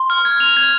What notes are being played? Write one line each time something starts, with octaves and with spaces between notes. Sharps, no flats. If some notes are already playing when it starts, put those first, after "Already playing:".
Already playing: C6
F6
G#6
F7
G#6